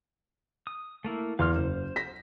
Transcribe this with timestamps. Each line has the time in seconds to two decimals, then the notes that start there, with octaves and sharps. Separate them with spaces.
0.67 D#6
1.04 A3 A#3 E4
1.39 E2 F5 C6 F6
1.56 F#1 C5
1.96 A#6 B6